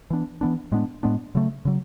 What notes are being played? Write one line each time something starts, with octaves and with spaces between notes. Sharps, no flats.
E3 B3 D4
E3 B3 D4
A2 G#3 B3 D4
A2 G#3 B3 D4
C#3 F#3 A3
C#3 F#3